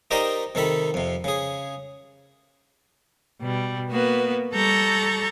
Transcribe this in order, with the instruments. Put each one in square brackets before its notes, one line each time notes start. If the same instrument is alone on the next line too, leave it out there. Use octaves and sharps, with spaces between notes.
[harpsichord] D#4 G4 A#4 C5 D5 D#5
C3 D#3 A4 B5
F2 C3
C#3 G#4
[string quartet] B2 G3
A#3 B3 F#4 B4
G3 A4 A#5 C#6 G6 A6